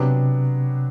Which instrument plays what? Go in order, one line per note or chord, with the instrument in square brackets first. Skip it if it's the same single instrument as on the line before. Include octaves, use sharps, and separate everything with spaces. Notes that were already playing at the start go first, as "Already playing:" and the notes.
Already playing: [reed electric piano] C3 [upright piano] F#3 B3 D4 G4